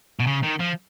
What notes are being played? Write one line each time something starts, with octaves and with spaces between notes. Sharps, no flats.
B2
C#3
D#3
F3